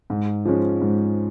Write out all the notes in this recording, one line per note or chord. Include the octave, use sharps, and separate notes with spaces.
G#2
F3 G#3 C#4
G#2